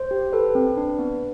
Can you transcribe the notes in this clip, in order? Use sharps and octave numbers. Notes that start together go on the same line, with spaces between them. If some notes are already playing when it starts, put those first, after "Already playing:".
Already playing: C5
G4
A4 B4
C4
D4
B3